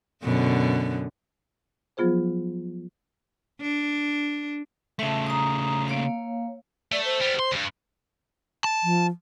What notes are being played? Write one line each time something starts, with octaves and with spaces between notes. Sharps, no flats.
F#2 B2 D3
F3 F#3 B3 F4 G#4 C5
D4
C#3 A3 E5 A5
A#5 D#6
A#3 C#5 F5
A3 D5
C5
G3 B3
C6
D2 G2
A5
F3